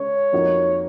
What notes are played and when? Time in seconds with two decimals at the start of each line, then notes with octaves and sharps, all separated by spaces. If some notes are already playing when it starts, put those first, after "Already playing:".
Already playing: C#3 G#3 C#5
0.32 F2 F3 A#3 D#4 F#4